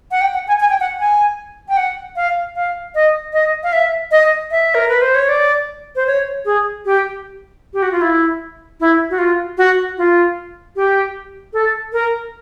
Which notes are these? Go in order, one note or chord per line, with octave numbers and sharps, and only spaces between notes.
F#5
G5
F#5
G#5
G#5
G5
F#5
G#5
G5
F#5
F5
F5
D#5
D#5
F5
E5
D#5
E5
A#4
B4
C5
C#5
D5
C5
C#5
G#4
G4
G4
F#4
F4
E4
E4
F#4
F4
F#4
F4
G4
A4
A#4